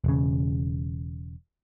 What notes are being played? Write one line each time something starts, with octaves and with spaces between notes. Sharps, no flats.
E1 C#3